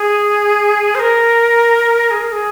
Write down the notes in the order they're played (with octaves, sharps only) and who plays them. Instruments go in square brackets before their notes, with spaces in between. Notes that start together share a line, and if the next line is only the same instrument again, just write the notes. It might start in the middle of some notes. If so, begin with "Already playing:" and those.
Already playing: [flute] G#4
C5
A#4
G#4
A#4
G#4